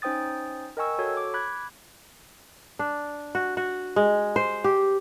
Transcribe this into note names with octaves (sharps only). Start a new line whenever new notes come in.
C#4 D#4 C5 G5 D#6 A6
A#4 D#5 G5 G#5 C#6 E6
F#4 A4 C#5
D6
B5 D6 F#6 G#6
D4
F#4
F#4
G#3
C5
G4